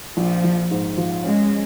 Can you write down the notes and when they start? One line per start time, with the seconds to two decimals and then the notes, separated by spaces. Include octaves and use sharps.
0.17 A#1 F3
0.44 A#1
0.71 G#2
0.98 F3
1.24 G#3 C#4